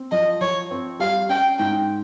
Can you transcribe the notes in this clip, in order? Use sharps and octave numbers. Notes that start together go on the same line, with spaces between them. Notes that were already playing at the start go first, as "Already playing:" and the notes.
Already playing: C4
F3 D#5
F3 C#5
C4
G3 F5
C#4 G5
G#2 G5